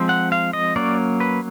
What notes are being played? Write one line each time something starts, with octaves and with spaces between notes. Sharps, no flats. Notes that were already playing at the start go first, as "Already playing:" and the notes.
Already playing: F3 G#3 C4
F#5
F5
D#5
F#3 A#3 C#4 D5
B4